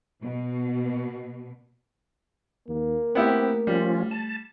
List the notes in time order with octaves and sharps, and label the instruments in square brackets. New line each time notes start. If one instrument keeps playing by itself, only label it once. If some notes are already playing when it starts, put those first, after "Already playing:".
[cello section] B2
[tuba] D#2 [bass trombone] A#3
[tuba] A3 [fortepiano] B3 E4 G4 [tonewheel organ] C4
[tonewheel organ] F3 C#4 F4 [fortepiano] G3
[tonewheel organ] A5